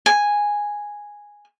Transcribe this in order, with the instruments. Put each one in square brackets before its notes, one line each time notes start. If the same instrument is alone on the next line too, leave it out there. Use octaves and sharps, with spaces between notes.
[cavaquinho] G#5